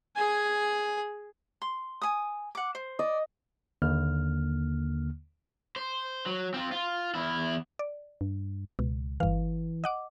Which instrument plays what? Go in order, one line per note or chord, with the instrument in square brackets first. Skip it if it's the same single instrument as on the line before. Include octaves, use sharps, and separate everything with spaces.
[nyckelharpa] G#4 G#5
[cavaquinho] C6
G#5 D#6
F#5 D6
C5
[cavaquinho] D5 [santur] D#5
[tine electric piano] D#2 D3 A#3 F6
[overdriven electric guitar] C5
F#3
C4 F4
F4
E2 E4
[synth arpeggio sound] D5
[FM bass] G2
[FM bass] C#2 [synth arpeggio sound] B2
[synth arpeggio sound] G1 F5 [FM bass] E3
[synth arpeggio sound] D#5 F#5 D6